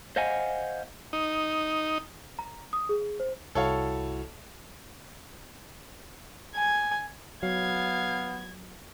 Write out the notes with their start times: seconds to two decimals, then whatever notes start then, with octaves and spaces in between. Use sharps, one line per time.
0.16 C5 D#5 F5 F#5 G#5
1.13 D#4
2.39 A#5
2.73 D#6
2.89 G#4
3.20 C5
3.55 C2 E4 F#4 A4 C#5 F5
6.55 G#5
7.43 F#3 B3 F5 G#6